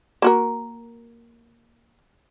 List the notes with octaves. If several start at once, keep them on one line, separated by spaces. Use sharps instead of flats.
A#3 F#4 A#4